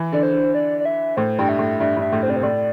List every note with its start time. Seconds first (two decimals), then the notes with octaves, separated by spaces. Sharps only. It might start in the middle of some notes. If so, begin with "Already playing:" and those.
Already playing: E3
0.12 D3 D5
0.23 C5
0.33 D3
0.54 D5
0.80 D5
0.85 E5
1.17 A2 C5
1.39 G2 G5
1.49 E5
1.59 A2
1.80 G2 E5
1.97 G2 E5
2.12 A2
2.23 C5
2.28 C3 D5
2.36 C5
2.43 A2 D5